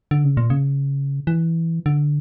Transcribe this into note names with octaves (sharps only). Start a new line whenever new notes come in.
D3
C#3
A#2
C#3
E3
D3